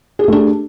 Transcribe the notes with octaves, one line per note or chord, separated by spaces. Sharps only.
A3 D4 G4 G#4